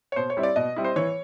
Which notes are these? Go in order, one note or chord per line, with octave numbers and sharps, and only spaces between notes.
C#5
B2 C5
C#5
G3 C4 E4
D5
B2 D#5
G3 C4 E4
C5
E3 C#5